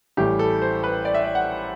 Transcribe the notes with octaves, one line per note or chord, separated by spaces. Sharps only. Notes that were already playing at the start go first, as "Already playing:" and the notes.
A1 A2 E3 G3 G4
A4
C5
B4
D5
E5
D5
F#5